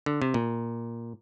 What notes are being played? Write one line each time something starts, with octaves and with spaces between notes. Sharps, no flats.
D3
C3
A#2